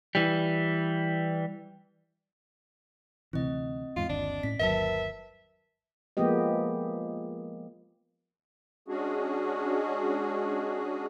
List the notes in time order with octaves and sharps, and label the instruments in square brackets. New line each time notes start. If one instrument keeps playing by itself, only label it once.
[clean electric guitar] E3 G3
[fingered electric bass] D2 C3 E3 [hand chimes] C4 D#5
[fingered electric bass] E2 G#2 [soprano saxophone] F4
[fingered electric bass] G1 D#2 [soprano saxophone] D4
[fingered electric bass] A2 C#4 [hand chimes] B6
[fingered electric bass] G1 D#2 F#3 [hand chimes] A#4 B4 A5 [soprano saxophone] E5
[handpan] F3 G#3 A#3 B3 G4 D#5
[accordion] G#3 C#4 D4 F#4 G#4